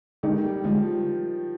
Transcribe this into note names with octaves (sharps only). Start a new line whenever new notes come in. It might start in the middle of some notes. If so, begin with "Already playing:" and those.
D3 D#3 G#3 D#4 G4
G3
D3 F3 G#3